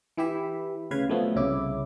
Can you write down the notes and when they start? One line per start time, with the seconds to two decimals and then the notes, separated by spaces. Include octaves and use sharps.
0.17 E3 E4 G4 E5
0.91 D2 C#3 B4 F5 G#6
1.09 B2 F3 F#3 A3 B3
1.36 C2 C#3 E4 D6